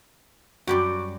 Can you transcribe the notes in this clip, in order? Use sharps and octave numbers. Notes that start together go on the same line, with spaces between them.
F#2 G3 F#4 D5